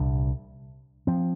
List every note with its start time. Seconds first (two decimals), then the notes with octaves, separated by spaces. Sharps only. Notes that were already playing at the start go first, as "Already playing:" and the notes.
Already playing: C2 A#2 G3 D4
1.07 F3 C4